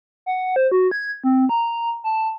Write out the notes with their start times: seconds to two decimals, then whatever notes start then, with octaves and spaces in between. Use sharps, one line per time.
0.26 F#5
0.56 C5
0.72 F#4
0.91 G#6
1.24 C4
1.49 A#5
2.04 A5